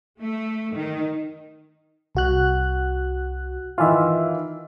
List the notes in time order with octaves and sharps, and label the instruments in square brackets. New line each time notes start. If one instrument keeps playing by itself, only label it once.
[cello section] A3
D#3
[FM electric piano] C2 F#4 F#6
[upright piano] D#3 E3 F4 [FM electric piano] E5 F5